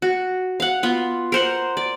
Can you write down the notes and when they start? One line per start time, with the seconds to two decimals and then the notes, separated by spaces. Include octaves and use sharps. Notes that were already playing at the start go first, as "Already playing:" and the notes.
0.02 F#4
0.60 F5 F#5
0.83 B3 F4
1.32 A#4 C5 F#5
1.77 D5